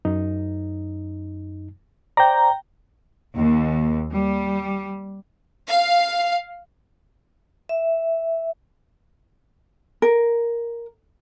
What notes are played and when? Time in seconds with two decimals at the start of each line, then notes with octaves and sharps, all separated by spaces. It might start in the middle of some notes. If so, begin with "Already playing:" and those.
0.05 F#2 D#4
2.17 C5 D5 G5 A#5
3.36 D#2
4.13 G3
5.67 F5
7.69 E5
10.02 A#4